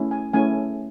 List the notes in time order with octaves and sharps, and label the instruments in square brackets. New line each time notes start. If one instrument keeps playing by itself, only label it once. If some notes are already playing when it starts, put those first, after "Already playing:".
Already playing: [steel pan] A3 C#4 E4
G#5
A3 C#4 E4 G#5